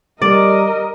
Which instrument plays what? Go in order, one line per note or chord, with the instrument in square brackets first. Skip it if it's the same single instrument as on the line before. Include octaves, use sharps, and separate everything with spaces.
[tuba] G3 [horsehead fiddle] A#4 D#5 [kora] D5